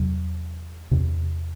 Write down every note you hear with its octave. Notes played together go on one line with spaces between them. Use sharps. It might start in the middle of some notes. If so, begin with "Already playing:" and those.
Already playing: E2 C3 F#3
E2 C3